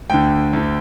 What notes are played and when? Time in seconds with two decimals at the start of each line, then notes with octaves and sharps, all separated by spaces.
0.10 D2 D3 G5
0.53 D2 D3